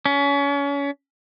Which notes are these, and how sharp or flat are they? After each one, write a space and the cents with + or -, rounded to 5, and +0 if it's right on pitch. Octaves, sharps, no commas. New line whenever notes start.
C#4 +30